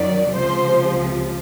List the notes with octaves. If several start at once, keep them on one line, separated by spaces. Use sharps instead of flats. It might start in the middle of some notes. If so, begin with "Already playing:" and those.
Already playing: F#2 D#3 F#3 D5
C#2 C3 F3 C5